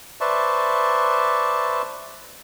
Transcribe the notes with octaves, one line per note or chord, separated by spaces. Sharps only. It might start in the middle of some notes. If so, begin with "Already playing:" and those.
B4 C5 D5 E5 A5 C#6